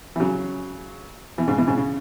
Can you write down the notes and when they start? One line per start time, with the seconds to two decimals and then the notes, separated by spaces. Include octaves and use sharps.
0.16 E3
0.20 C#3 F#3
1.38 B2 E3
1.48 G#2 C#3
1.58 B2 E3
1.67 G#2 C#3
1.77 C#3